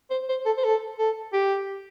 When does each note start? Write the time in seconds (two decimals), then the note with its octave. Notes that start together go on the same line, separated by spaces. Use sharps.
0.10 C5
0.29 C5
0.46 A4
0.57 C5
0.64 A4
0.98 A4
1.33 G4